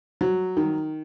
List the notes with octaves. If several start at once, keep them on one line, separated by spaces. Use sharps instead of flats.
F#3
D#3